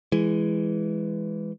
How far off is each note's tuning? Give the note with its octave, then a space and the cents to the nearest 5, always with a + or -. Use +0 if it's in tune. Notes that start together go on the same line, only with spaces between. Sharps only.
E3 +10 G#3 +0